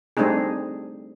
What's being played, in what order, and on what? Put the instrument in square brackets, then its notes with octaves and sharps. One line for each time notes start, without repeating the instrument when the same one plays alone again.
[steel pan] G3 A3 C4 D4 D#4 G#4